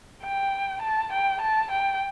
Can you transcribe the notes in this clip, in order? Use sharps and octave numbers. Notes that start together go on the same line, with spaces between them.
G5
A5
G5
A5
G5